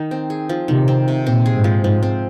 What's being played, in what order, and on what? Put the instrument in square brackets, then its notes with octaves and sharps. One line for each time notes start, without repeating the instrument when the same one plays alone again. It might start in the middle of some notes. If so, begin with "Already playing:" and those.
Already playing: [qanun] D#3 D#4
C4
G#4
F3
[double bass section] C3 [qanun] D#3
[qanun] C4
C3
[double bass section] A#2 [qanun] C4
[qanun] G#4
[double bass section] G#2
[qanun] F3
[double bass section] G#2 [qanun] F3
[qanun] C4